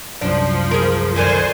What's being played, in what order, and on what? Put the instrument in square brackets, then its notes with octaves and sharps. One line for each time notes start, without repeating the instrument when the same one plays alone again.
[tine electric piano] C2 F#2 [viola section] F3 [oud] D4
[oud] G#4 A#4
[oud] D3 D#3 F#3 [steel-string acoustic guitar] A#4 D5 D#5 [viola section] C5 G#5